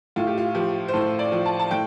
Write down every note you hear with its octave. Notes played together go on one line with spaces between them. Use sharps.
A2 F4
G4
F4
F3 G4
C5
A2 A4
D5
F3
A5
A5
A2 G5